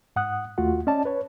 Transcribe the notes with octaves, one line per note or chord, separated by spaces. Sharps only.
G#2 F#5 D#6 F#6
D#2 A3 F4 F#4 F#5
C#4 D5 D#5 A5
B4 C#5